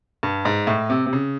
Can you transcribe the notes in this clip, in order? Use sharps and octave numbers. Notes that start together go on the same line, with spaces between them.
G2
G#2
A2
C3
C3
C#3